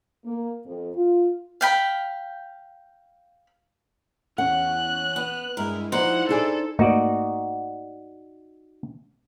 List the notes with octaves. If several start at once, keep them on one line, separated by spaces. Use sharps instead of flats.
A#3
F2
F4
F5 G5 B5
E2 C#4 F#5 F#6
B3
G2 G#3 E4 A#4
F3 D#4 E4 F#4 C5 D5 F#5
D4 G#4 A4 D5
G#2 A3 A#3 D#4 F#4 D5